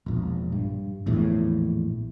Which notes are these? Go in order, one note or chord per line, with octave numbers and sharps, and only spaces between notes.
E1 A#1
G2
A#1 E2 A2